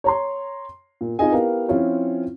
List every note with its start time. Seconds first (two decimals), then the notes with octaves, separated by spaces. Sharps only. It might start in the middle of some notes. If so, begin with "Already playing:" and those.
0.04 C#5 A#5 C6
1.01 A#2
1.19 C4 D#4 F4 G#4 D#5 G#5
1.32 B3 E4 G4 A#4 F5
1.69 F3 C4 C#4 E4 F4 C#5